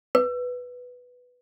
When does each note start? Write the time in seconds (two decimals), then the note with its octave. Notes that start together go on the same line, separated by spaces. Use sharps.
0.15 B4